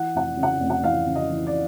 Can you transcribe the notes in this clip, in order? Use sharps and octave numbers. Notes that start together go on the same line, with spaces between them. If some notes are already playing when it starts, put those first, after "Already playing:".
Already playing: E3 F#5
F1 F#5
C#3
F#5
F1
F#5
E3 F5
C#3
D#5
E3
D5